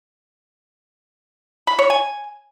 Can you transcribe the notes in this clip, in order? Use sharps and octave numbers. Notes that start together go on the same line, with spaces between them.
B5
C#5
G#5